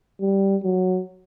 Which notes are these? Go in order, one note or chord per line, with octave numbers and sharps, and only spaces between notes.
G3
F#3